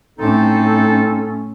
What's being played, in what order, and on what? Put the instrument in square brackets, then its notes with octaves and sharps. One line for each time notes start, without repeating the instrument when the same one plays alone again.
[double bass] A2 C#4 [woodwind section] C4 D#4 A4